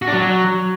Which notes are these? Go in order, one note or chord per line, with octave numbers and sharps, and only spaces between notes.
F#4
D4
F#3